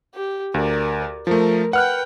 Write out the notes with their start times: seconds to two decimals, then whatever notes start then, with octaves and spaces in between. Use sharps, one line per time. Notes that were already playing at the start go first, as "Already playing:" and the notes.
0.14 G4
0.54 D2 A#4 D5
1.27 F3 A3 A#4
1.73 B4 F#5 G5 F6 F#6